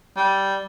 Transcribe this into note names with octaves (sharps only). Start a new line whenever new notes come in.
G3